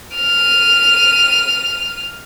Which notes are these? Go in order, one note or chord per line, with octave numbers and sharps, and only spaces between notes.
F6 D#7